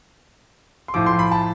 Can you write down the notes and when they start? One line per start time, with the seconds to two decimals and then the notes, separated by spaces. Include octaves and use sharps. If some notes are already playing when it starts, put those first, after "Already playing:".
0.88 C6
0.94 A2 F3 D6
1.06 C6
1.19 B5
1.32 A5